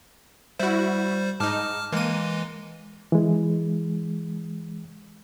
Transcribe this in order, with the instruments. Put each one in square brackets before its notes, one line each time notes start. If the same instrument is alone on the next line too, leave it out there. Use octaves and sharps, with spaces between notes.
[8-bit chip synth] G3 C5 [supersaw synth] E4 F#4
[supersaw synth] G#2 D#4 [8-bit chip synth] A5 D6 F6
[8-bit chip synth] E3 G#3 [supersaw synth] A#3 D#7
[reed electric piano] E3 G#3